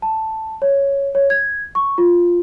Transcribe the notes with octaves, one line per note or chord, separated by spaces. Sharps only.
A5
C#5
C#5
G#6
C#6
F4